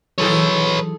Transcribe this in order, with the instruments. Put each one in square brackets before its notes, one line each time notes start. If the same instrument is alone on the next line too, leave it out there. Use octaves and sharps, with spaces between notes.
[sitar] D#3 G#4 A4 [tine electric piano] E3 F#3 [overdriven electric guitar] B4 C#5